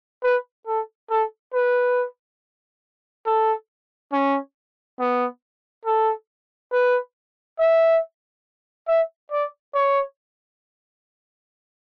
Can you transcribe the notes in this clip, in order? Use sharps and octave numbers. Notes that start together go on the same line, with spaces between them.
B4
A4
A4
B4
A4
C#4
B3
A4
B4
E5
E5
D5
C#5